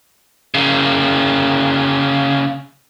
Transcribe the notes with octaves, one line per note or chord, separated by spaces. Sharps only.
C#3 A#3